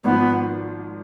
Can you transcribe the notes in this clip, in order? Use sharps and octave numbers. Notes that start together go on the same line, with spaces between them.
G#1 G#2 F3 B3